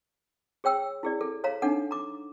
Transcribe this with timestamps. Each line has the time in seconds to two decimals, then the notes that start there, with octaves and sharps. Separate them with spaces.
0.64 G#4 C#5 G5 E6
1.03 E4 G#4 D5
1.21 A4
1.44 C#5 F5 A#5
1.62 D4 D#4 A4 F#5
1.91 A#5 D6